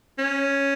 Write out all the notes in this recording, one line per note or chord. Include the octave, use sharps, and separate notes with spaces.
C#4